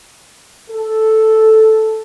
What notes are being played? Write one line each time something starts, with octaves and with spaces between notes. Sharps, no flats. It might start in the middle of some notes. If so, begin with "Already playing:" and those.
A4